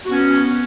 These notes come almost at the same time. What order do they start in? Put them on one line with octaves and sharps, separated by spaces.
F#4 B3 C#4